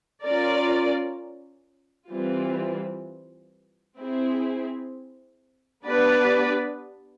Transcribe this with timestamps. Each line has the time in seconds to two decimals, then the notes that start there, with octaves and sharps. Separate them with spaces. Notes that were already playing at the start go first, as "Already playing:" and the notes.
0.23 C#4 F4 A#4 D5
2.09 E3 G3 C4 F4
3.97 C4 E4 G#4
5.85 B3 D4 G4 B4 D5